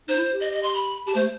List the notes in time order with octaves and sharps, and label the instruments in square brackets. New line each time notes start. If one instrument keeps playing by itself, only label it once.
[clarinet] D#4 [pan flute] C5
[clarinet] E4
G4
[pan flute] D#5
D#5
C6
B5
[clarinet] G4 [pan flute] A5
[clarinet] A3 [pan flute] C5